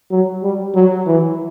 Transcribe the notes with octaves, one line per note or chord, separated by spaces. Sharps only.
F#3
G3
F#3
E3